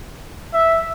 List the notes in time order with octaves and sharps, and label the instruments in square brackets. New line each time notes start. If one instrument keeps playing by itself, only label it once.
[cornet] E5